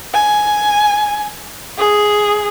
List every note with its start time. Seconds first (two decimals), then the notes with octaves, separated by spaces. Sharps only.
0.14 G#5
1.78 G#4